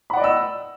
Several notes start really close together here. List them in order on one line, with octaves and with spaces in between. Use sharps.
B5 F#5 D5 D#5 E6